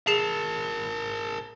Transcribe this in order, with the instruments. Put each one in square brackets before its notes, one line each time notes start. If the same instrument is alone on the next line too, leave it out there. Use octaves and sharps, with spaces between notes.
[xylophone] G#4 C7 E7 [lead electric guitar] A#4 A5